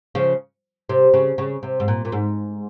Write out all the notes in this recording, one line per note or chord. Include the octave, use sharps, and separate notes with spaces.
C#3 F3
C3
C#3
C#3
C3
G#2
A#2
A#2
G#2